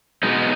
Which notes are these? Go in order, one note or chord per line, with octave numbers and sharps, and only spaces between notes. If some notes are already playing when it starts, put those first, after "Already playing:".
B2 G#3 B3 D#4